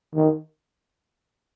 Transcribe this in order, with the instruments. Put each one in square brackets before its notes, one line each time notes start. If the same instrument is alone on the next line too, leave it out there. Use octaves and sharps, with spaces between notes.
[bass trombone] D#3